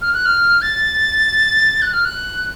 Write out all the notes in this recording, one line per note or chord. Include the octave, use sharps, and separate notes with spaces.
F6
F#6
F6
A6
F#6
F6
F#6